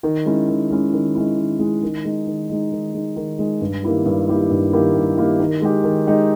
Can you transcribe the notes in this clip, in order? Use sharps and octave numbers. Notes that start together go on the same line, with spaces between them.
D#3
G#3 C#4 E4
D#3
G#3 C#4 E4
D#3
G#3 C#4 E4
D#3
G#3 C#4 E4
D#3
G#3 D#4
D#3
G#3 D#4
D#3
G#3 D#4
D#3
G#3 D#4
G2
D#3 A#3 E4 G4
G2
D#3 A#3 E4 G4
G2
D#3 A#3 E4 G4
G2
D#3 A#3 E4 G4
D#3
G#3 D#4 G4
D#3
G#3 D#4 G4